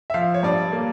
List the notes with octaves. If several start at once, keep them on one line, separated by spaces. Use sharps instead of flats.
E5
F3 F5
C#5
G2 D5
A#3